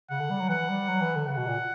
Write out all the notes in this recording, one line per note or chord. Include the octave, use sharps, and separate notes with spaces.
C#3 F#5
D3
G3
F#3
E3 F#5
G3
F#3
E3
D3
C#3 F#5
B2
A#2